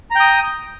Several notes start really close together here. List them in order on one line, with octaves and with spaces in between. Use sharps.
A#5 G5 D#6